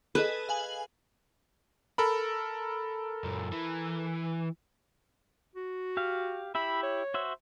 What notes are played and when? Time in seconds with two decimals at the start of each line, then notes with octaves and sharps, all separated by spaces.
0.15 G#4 A4 B4 D#5
0.49 F5 G#5 F#7
1.98 A4 A#4 B5
3.24 F#2 A#2
3.53 E3
5.56 F#4
5.97 G4 F5
6.55 E4 G4 E5 B5
6.83 C#5
7.14 F#4 C5 E5